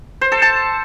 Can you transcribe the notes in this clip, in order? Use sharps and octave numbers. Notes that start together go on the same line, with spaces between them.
C5
A4
A5